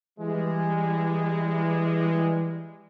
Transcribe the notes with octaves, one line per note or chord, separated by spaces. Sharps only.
E3 G3 G#3